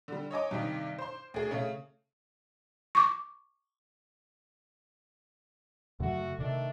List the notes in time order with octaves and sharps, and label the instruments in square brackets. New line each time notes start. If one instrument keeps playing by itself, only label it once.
[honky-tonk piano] D3 G3
C#5 D#5 G#5 D6
G2 C3 D#3
C5 C6
D2 G#4
C#3 A3 C#4
[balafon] C#6 D6
[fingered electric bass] F#2 C#3 F#3 [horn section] A3 F#4
[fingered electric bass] C3 [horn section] D#3 A3 D4